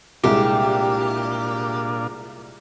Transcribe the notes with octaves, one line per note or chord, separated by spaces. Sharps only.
C2 A#2 G#3 D4 F4 G4